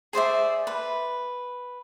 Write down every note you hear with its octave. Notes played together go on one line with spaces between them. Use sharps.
G#4 C5 D5 E5
B4